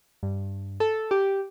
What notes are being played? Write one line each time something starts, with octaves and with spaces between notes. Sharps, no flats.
G2
A4
G4